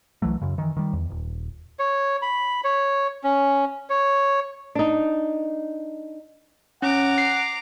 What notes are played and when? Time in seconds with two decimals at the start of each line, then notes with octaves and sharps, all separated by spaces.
0.22 C2 E3 F#3 A3
0.42 F#2 C#3
0.58 D#3 E3
0.77 D#3 G3
0.93 E2
1.10 D#1
1.79 C#5
2.22 B5
2.64 C#5
3.24 C#4
3.90 C#5
4.75 D4 D#4
6.82 C#4 F#5 A#5 D6
7.18 C7